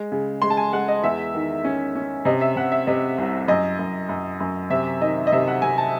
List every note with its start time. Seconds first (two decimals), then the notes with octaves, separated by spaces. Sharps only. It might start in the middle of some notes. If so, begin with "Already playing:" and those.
Already playing: G#3
0.12 C#3
0.42 G#3 C6
0.50 A5
0.57 G#5
0.73 G#3 F#5
0.88 D#5
1.03 E2 E5
1.34 D#3
1.64 C#4
1.95 C#4
2.25 C3 D#5
2.41 E5
2.56 C3 F#5
2.72 E5
2.87 C3 D#5
3.18 C2
3.48 F#2 D#5
3.79 F#2
4.09 F#2
4.40 F#2
4.70 C3 E5
5.01 D#3 D#5
5.27 D#5
5.32 C3 E5
5.48 F#5
5.62 C3 G#5
5.78 A5